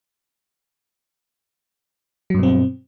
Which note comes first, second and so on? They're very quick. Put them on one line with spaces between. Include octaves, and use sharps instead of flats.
F#3 G2 B2 C4